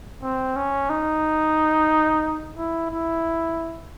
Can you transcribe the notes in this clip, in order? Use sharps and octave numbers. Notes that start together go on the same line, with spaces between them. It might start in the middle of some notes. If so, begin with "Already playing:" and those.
C4
C#4
D#4
E4
E4